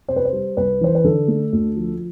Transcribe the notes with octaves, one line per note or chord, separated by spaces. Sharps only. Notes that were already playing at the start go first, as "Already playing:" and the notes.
C3 C5
B4
C5
G3
C2 B4
E3 C5
B4
D3 A4
A3
D2
F3